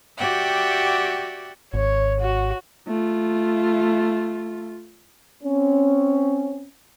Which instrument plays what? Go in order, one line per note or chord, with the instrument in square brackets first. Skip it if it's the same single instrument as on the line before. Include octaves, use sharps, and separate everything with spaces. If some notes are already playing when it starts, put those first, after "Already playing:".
[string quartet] F#4 G4 D5 E5 F#5 G5
[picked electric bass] G#1 [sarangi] C#5
[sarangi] F#4
[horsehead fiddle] A3 F4
[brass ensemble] C4 C#4